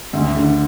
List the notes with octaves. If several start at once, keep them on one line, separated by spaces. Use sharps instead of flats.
D2
D3